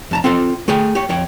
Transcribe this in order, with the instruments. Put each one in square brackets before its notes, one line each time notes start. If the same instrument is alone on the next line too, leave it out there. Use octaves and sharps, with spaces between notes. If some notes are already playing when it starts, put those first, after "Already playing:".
[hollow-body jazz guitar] F2 A5 A#5
C4 F4 A4 C5
A3 G#4 G5
G4 C#5
F2 C#5 G5